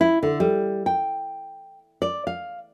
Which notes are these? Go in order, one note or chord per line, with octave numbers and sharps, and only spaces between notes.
E4
D3
G3
G5
D5
F5